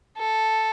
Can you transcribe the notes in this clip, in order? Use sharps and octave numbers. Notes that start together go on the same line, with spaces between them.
A4